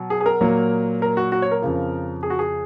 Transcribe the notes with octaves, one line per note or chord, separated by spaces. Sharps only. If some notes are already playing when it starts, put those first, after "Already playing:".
Already playing: B2 F#3
G#4
G#4
A#4
A#2 F#3 A#3
A#4
F#4
F#4
C#5
A#4
F2 C#3 F3
G#4
F#4
G#4